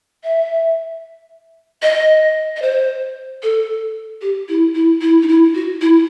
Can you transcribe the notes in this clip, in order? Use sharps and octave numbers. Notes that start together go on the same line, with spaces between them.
E5
D#5
D#5
C5
A4
G4
E4
E4
E4
D#4
E4
F#4
E4